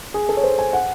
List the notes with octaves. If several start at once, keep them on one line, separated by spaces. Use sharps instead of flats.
G#4
A4
C#5
C5
G#5
F#5